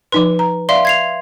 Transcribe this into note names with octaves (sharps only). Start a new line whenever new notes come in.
F3 D#4 B4 C6
A#5
D5 E5 F5 C6
G#6 C7 F7